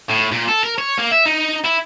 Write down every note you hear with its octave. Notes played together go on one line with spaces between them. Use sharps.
A2
A#2
A4
A#4
C#5
A#3
E5
D#4
E4